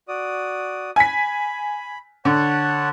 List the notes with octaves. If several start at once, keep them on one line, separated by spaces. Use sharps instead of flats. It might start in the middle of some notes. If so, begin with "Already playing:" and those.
F#4 D5 D#6
G#5 B5 B6
D3 C#5 F#5 A5